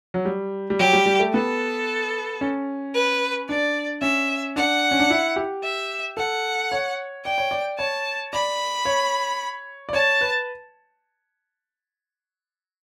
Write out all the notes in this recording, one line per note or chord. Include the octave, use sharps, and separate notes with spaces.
F#3
G3
G3
F#3 G4
G3
G3
A3
B3 A4
C#4
B4
D4 D5
C#4 E5
D4 F#5
C#4
D4
E4
G4
E5
A4 F#5
C#5
D5 G5
C#5
D5
C#5 A5
D5 B5
C#5
D5
C#5 A5
B4